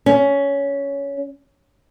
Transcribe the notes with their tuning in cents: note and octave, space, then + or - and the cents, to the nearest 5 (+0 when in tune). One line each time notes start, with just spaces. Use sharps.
C#4 +15